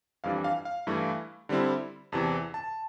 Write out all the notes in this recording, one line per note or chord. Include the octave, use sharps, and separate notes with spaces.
F2 E3 G3 D4 F5
F5
F5
G2 E3 A3 E4
D3 G3 C4 E4
E2 C3 E3 A5
A5